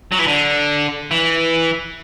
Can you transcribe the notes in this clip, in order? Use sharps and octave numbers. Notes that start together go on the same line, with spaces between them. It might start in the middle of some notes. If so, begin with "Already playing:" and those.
F#3
E3
D3
E3